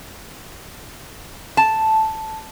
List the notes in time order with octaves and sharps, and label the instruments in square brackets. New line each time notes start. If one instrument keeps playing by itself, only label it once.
[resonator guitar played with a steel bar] A5